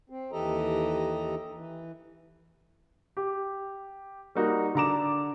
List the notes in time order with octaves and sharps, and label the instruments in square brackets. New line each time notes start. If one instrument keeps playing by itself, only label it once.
[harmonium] C4
D#2 E3 G4 A4 D#5 A#5
E3
[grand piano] G4
G3 A#3 D#4 F#4 A#4
D3 A4 A#5 D6 E7